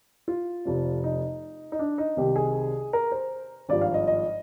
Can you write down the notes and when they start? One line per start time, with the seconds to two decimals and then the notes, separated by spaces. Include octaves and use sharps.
0.28 F4
0.65 F1 F2 C3
1.04 D#4
1.72 D#4
1.79 D4
1.98 D#4
2.17 C2 C3 D#3 G4
2.36 G#4
2.93 A#4
3.12 C5
3.69 G#1 G2 F3 D5
3.81 F5
3.94 D#5
4.07 D#5